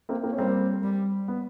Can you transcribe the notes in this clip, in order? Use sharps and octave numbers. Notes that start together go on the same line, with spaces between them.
A#3 C4
A#3 C4
C#4
G3 A#3 C4
G3
B3